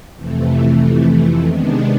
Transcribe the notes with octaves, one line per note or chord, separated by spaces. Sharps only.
F2 C3 E3 A3
C3 D#3 G#3 B3 D4